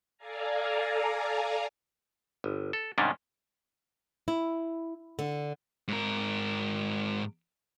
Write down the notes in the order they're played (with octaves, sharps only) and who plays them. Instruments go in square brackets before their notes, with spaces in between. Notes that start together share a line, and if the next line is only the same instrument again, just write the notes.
[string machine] A4 D5 F5 G#5 A#5
[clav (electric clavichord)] G1
A4
G#2 C3 D#3 G3 C#4 D4
[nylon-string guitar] E4
D3
[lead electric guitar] G#2 A#4